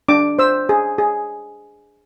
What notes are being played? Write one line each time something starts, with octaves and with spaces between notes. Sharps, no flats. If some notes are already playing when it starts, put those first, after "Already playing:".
D4 D6
C5 E6
G#4
G#4